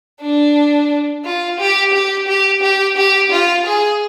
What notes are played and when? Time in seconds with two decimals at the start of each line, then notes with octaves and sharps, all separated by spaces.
0.21 D4
1.24 F4
1.59 G4
1.93 G4
2.27 G4
2.62 G4
2.97 G4
3.31 F4
3.66 G#4